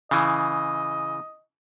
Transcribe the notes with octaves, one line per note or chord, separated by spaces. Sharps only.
C#3 E3 D#5